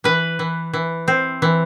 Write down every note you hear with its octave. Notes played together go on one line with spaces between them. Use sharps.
E3 B4
E3
E3
C4
E3